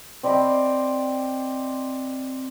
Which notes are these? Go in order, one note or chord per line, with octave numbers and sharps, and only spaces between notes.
C4 D5 D#5 B5